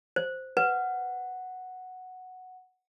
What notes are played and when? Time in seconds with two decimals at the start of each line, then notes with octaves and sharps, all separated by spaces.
0.16 C5
0.57 B4 F#5